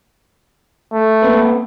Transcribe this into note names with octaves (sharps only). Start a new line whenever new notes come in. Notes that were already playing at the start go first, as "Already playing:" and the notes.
A3
A#3 C4 B4